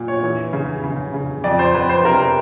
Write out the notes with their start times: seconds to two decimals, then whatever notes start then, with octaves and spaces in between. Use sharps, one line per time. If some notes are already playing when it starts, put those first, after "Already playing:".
Already playing: A#2
0.08 C#5
0.23 E3
0.53 C#3
0.84 C#3
1.14 C#3
1.44 F2 D5
1.59 C5
1.74 F2 B4
1.90 C5
2.05 C3 A#4